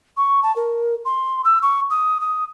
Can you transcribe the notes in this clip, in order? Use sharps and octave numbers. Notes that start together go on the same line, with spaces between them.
C#6
A5
A#4
C6
E6
C#6
D#6
D#6